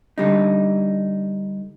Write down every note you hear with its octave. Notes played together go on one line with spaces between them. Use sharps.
D3 G3 D#4